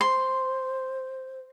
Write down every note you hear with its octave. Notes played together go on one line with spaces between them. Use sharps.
C5 C6